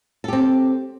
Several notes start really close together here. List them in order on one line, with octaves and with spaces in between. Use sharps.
A4 G4 C4